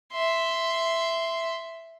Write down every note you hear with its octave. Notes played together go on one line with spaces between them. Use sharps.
E5 C6